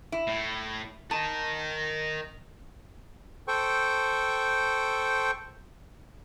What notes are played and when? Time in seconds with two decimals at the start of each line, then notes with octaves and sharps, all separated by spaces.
0.12 E4
0.27 A2
1.11 A#4 D#5 A5
3.48 A4 C5 G5 C#6